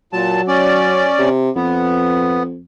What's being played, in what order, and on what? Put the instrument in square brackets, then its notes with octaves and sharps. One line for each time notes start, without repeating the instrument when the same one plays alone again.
[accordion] A#2 A5 [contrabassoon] F#3
[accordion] C#4 D5
[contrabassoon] C3
[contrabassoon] F2 [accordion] B3